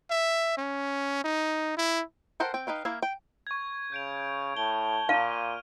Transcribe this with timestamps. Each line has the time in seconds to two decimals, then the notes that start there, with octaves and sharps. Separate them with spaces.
0.10 E5
0.58 C#4
1.24 D#4
1.77 E4
2.40 A4 A#4 C5 F#5 G5
2.54 C4 G5
2.67 D#4 B4 F5 G5
2.85 A#3 E4 E5 F5
3.03 G5
3.47 C#6 G#6
3.92 C#3 G6 D7 F7
4.57 A2 A5 G7
5.09 A#2 F5 F6 D#7 G7